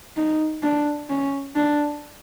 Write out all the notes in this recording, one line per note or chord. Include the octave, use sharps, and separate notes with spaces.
D#4
D4
C#4
D4